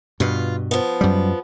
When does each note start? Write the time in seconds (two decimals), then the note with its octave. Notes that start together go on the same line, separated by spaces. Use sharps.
0.20 G2 B2 F4
0.71 F3 B3
1.01 F#2 G3